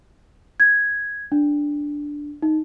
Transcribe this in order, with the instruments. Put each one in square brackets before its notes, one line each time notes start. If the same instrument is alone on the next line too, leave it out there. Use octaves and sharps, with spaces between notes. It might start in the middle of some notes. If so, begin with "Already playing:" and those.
[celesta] G#6
D4
D#4